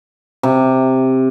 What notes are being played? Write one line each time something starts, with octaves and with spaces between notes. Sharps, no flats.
C3